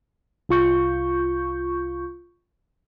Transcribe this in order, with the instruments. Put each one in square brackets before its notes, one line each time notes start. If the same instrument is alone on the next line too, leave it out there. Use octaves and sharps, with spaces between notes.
[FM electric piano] C2 F4 C#6 G6